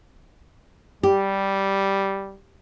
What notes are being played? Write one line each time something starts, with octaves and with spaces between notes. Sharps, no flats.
G3 G4